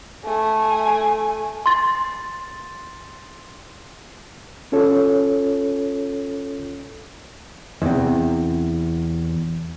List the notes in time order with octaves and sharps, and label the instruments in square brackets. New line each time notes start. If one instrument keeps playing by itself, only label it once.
[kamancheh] A3 G#5
[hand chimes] C6 A6
[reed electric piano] C#4 F4 A4 C#5
[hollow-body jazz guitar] E2 C3